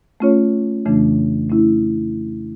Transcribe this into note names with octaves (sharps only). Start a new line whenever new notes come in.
A3 C#4 F4 C#5
F2 C#3 E3 A3 D4
A3 C#4 E4